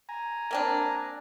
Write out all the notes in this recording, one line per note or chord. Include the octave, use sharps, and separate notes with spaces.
G#5 A#5
A#3 C4 D4